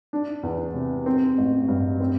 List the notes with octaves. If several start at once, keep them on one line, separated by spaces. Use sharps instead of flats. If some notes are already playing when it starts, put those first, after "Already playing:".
D4
E2
C3
C4
A1
G2
C4